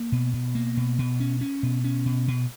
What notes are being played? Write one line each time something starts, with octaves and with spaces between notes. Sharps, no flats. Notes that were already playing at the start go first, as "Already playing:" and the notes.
Already playing: A#3
B2
B2
A#3
B2
B2
C#4
C#4
B2
C#4
B2
B2